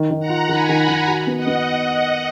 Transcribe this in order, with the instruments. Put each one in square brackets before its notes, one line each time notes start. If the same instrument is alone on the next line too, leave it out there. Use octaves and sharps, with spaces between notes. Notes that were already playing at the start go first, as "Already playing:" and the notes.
Already playing: [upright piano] D#3
D#3
[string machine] F#5 A#5
[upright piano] F4
[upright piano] D#3 [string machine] G#5 B5
[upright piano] D#3
[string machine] F#5 A#5
[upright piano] D#3
F#4
B3
[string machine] D#5 F#5
[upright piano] B3